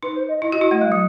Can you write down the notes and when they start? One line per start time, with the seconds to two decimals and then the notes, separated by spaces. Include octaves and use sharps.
0.03 D#4 B4
0.15 C5
0.28 D#5
0.41 E4 D#5
0.52 F#4
0.61 E4
0.71 A3
0.81 G3
0.92 F#3